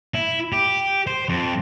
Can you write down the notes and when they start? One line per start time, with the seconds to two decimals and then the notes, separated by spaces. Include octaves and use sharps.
0.14 E4
0.53 G4
1.07 C5
1.29 F2